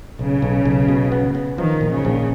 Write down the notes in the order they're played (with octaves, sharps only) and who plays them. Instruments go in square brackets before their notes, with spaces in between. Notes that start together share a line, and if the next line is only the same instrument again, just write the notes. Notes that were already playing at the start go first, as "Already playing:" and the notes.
[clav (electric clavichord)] B1 [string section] C#3
[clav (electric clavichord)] B1
B1
B2
B3
B3
[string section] D#3 [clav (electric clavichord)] F3
[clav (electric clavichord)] A#1
[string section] C#3
[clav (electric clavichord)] A#1